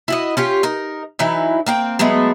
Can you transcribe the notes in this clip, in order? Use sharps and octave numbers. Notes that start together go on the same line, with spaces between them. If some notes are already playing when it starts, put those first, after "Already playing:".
E4 F#4 D#5
C#4 F4 G4
D#4 A#4
E3 F#3 D#4 E4
A#3 C4 G5
F#3 G#3 A3 B3